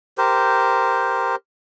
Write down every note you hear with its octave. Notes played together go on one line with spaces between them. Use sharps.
G4 A#4 C5